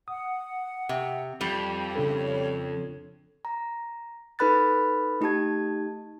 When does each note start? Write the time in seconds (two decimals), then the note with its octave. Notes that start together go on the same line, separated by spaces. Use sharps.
0.08 F#5 D#6
0.89 C3
1.41 F2 G3
1.95 C#3 D4 A4 C#5
3.45 A#5
4.39 D#4 A4 B4 B5 F#6 A6
5.21 A3 D#4 G4 A5 G#6